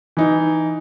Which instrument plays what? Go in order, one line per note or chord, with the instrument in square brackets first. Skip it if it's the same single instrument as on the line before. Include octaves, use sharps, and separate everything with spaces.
[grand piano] E3 D#4